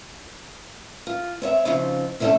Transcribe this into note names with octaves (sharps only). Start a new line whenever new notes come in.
F4
C4 C#5 E5
C#3 F3 C4 D#4
C3 E3 A3 C#4 D#4 A4